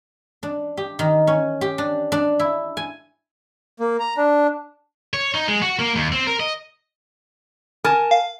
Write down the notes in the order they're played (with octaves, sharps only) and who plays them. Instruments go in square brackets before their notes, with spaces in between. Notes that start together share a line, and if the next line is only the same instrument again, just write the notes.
[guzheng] D4
G4
D#3
C#4
G4
D4
D4
E4
G#5
[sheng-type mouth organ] A#3
A#5
D4
[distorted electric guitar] C#5
D#4
G#3
F#4
A#3
D#2
C4
A#4
D#5
[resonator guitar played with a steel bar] A#4 G#5 A5
[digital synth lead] F5